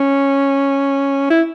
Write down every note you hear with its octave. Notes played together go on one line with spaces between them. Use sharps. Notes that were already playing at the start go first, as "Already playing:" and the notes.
Already playing: C#4
E4